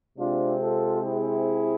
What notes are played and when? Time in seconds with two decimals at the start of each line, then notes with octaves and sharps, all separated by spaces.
0.18 C3 G#3 C4 D4 F4
0.61 F4 A4
1.03 E4 G#4